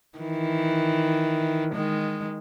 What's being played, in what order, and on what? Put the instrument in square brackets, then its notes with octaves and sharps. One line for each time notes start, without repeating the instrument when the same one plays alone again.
[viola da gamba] D#3 E3
D#3 G#3